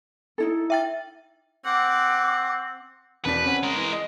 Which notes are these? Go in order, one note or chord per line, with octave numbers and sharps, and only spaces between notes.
D#4 E4 A4
E5 G5 A6
C4 F#5 D6
E1 D4 B4 B6
C4 C#4 F#5
G#3 A#4
E3
D#5